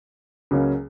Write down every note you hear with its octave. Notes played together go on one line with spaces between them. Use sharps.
C#2 C#3 F#3 A#3 C#4